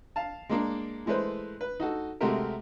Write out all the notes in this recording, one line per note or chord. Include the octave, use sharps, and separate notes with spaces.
F5 A5
G#3 A#3 D4
E3 G#3 A3 B4 C5
B4
D#4 F#4 A4
C3 G#3 A3 F#4 G4 A#4